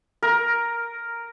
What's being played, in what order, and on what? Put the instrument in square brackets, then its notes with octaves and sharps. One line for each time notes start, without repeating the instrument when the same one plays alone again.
[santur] A#4